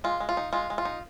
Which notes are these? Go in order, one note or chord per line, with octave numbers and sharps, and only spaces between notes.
G#3 F4
G#3
F4
D#4
G#3 F4
G#3
F4
D#4